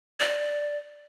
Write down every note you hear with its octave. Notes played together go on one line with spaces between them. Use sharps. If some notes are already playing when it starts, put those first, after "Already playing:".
D5